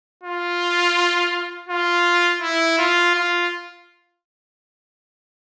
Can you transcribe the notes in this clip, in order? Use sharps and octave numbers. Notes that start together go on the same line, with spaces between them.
F4
F4
E4
F4
F4